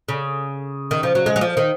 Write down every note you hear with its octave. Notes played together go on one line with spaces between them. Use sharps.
C#3
D#3
F3
F#3
G#3
F#3
F3
D#3